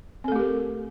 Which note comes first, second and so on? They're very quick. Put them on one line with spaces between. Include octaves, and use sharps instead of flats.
C4 A4 A3 G4 A#4